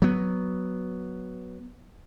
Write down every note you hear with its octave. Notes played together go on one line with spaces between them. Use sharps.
F#3 B3